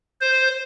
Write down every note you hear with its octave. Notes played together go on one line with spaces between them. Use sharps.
C5